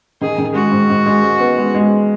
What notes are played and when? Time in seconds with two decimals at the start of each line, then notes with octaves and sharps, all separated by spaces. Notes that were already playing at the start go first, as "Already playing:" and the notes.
0.21 D#3 G#4
0.38 D#3
0.55 G#3 F#4
0.72 G#2
0.90 G#2
1.06 G#3
1.23 G#3
1.40 B3
1.57 G#3
1.74 G#3